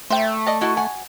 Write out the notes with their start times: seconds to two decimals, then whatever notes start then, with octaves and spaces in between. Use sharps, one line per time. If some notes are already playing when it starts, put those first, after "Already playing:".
0.10 A3 C5 E5 G5
0.46 D5 D#5 A5
0.61 E4 F#4 D#5 A5
0.77 F#5 G#5